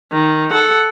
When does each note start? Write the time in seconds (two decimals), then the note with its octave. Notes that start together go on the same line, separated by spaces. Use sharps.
0.12 D#3
0.51 A4 F#5